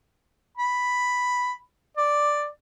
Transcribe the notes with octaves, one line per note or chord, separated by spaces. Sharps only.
B5
D5